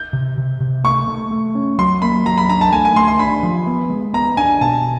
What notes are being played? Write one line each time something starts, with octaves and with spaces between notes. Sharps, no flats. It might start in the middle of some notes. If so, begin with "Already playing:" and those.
Already playing: G6
C3
C3
C3
A3 C#6
A3
A3
C#4
F#3 C6
A#3 B5
F#3 A#5
B5
D4 A#5
A5
A3 G#5
G#5
A3 C6
C6
D4 B5
F3
B3
G#3
B3 A#5
D4 G#5
B2 A5